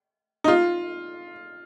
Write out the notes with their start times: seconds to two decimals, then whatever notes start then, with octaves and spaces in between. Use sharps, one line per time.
0.44 D#4
0.48 F4